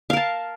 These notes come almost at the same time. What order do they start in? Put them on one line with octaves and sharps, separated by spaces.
F5 A#4 A5